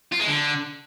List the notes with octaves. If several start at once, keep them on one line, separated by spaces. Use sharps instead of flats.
F4
G#3
D3